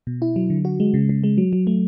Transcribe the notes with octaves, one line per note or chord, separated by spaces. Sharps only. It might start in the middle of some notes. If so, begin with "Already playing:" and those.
B2
E4
F#3
D3
F#4
G#3
C#3
C#3
G#3
F#3
F#3
A3